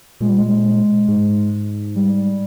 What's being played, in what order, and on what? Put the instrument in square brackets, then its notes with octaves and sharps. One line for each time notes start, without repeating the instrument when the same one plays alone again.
[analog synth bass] A#2 [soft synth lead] G#3
[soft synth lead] G3
G#3
[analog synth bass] G#2
[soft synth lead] G3